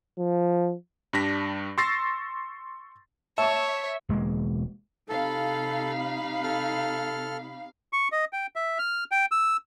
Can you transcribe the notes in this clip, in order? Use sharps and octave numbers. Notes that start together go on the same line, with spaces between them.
F3
G2 G3 D4 A#6 B6
C6 C#6 E6 A6 A#6 C7
C#5 E5 A5 C#6
E1 G#3 A#3
C3 D#4 A4 F5 B5
A4 F6
C#6
D#5
G5
E5
F6
G5
E6